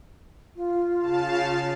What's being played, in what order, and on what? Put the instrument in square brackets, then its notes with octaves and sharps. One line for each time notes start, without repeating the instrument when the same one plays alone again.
[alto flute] F4
[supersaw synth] C#3 F5 A5